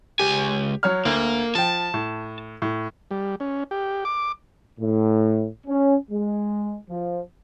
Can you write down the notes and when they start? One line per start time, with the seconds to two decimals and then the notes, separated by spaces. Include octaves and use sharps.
0.19 C#2 G4 G#5
0.83 F#3 C#5 F6
1.05 D2 A#3
1.55 F3 G5 A5
1.94 A2
2.62 A2
3.11 G3
3.40 C#4
3.71 G4
4.05 D6
4.79 A2
5.67 C#4
6.10 G#3
6.90 F3